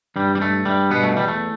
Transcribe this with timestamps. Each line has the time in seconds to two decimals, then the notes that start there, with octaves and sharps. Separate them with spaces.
0.16 G2 G3
0.35 G3
0.40 G2 A3
0.65 G2 G3
0.91 B2 B3
1.03 A3
1.16 E2 G3
1.28 A3